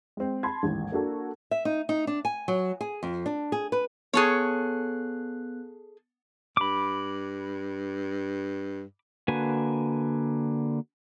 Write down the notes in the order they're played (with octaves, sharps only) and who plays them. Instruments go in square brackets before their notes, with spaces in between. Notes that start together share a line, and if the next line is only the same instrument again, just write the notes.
[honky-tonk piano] G#3 C4
A5 B5 C6 G#6
A1 D#2 G#2
A#3 D4 F#4 A4
[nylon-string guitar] E5
D#4
D#4
D4
G#5
F#3
G#4
F2
D4
G#4
B4
[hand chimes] B3 F#6 [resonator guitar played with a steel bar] G#4 A4 C#5
[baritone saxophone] G2 [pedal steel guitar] B5 D6
[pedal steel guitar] D3 A#3 F#4 B4 G#5